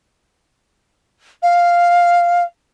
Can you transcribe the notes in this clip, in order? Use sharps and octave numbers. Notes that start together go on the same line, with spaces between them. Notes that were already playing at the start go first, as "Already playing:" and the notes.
F5